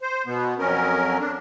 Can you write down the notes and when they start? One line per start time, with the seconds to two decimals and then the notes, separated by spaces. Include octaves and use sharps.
0.01 C5
0.27 B2 B3
0.59 F2 F#3 C#4 A#4
1.20 D4